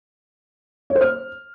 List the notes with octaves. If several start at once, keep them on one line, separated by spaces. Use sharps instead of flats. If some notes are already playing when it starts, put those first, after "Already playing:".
C#5
C5
F6